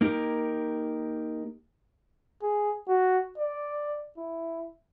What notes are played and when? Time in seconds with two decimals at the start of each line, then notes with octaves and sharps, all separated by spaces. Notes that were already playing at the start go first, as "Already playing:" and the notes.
0.01 A#3 D#4 E4 G4 A#4
2.43 G#4
2.88 F#4
3.38 D5
4.18 E4